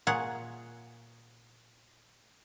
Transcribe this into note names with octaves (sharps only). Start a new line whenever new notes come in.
A#2 G#4 C#5 F#5